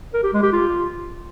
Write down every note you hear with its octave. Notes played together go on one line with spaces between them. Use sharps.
A#4
G4
G#3
G4
F4